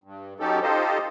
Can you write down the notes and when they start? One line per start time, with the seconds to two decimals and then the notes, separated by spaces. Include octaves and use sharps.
0.04 G2
0.40 F#3 C#4 D#4 G4 A4
0.62 D#4 F4 G4 A4 C5 D#5